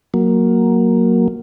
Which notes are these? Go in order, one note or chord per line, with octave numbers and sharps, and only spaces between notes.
F#3 A#3